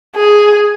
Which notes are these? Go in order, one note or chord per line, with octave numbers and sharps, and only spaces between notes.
G#4